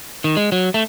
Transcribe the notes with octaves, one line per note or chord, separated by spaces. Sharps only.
D#3
G#3
F#3
A3